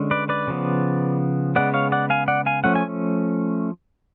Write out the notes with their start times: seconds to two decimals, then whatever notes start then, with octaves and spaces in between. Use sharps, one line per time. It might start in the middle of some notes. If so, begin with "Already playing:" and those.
Already playing: D3 G#3 C#4
0.11 B4 D5
0.29 B4 D5
0.47 C#3 F3 B3
1.56 C#3 G#3 B3 D5 F#5
1.74 C#5 F5
1.92 D5 F#5
2.10 F5 G#5
2.28 D5 F#5
2.46 F5 G#5
2.64 F3 A3 C#4 F#5
2.76 G#5